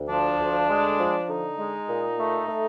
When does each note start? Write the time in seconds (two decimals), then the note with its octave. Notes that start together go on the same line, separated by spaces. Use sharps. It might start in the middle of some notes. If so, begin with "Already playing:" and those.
Already playing: D2
0.09 F3 D4
0.39 D2
0.68 G#3
0.98 F3
1.28 D3 D#4
1.58 G#3
1.88 A#2
2.19 A3
2.48 A3